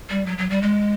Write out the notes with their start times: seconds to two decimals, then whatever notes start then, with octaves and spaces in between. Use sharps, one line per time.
0.10 G3
0.26 F#3
0.38 F#3
0.50 G3
0.62 G#3